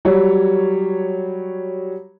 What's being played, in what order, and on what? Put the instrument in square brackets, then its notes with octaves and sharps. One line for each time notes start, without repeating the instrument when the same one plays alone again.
[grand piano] F#3 G3 C#5